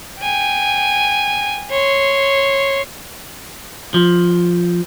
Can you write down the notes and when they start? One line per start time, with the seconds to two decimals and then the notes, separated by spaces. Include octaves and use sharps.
0.21 G5 G#5
1.70 C#5 C6
3.94 F3